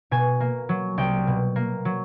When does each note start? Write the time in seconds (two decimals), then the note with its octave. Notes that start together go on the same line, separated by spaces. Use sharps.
0.11 B2 G#5
0.40 A#3
0.69 F#3
0.98 C2 G5
1.27 B2
1.56 A#3
1.85 F#3